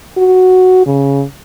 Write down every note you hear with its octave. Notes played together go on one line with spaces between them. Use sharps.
F#4
C#3